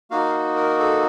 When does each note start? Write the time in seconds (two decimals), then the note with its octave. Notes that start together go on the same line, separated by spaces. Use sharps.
0.11 A#3 D#4 F#4 F5
0.56 A#4
0.79 A4